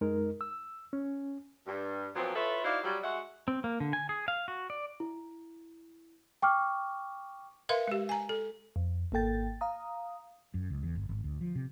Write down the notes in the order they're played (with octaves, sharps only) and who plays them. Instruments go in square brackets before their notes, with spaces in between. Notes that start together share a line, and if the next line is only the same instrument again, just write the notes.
[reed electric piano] F#2 G#3 D#4 A#4
E6
C#4
[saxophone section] G2
A#2 F3 F#3 B3 C4
E4 F4 A4 B4 C#5 E5
D#4 E4 F#4 C5 D5 F5
F#3 G3
G#3 F#4 E5 F#5
[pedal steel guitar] C4
A#3
D3
G#5
G#4
F5
F#4
D5
[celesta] E4
G5 C#6 D6 F6
[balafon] A#4 B4 E5 F5 C6
G#3 G4
G#5 A#5
A4
[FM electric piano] F2
G#1 A#3 A4 G5 A6
F5 A#5 D#6
[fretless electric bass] F#2
C#2
E2
G1
G#1
D2
F3
C3